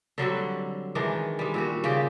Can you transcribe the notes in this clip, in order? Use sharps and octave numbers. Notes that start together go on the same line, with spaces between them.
D3 F#3 G3 C4
D#3 E3 G#3 D4
G3 G#3
A#2 G3 F#4
C#3 F4 G4 D5